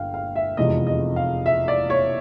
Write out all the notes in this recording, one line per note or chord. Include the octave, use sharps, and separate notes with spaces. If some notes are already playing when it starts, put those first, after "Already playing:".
Already playing: G1 F5 G5
F5
E5
F1 E2 C3 F3 G#3 D#5
D#5
F5
E5
D5
C#5